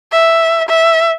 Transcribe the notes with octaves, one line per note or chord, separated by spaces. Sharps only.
E5
E5